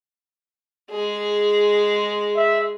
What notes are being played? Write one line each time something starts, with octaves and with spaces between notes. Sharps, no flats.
G#3 G#4
E5